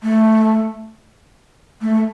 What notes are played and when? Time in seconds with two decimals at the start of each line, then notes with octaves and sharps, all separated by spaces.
0.03 A3
1.82 A3